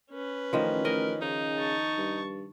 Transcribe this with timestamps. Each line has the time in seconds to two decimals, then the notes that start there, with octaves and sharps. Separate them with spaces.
0.11 C#4 B4
0.53 A1 D#3 F3
0.85 A1 A#4 D#5
1.22 C#3 D#4 G#4
1.59 A5 C#6
1.98 G2